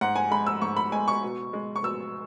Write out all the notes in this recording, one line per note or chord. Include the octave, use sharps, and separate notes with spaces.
G#2 F#5
G#5
G#3 B5
E6
G#2 C#6
B5
G#3 G#5
C#6
B2
G#3
C#6
B2 E6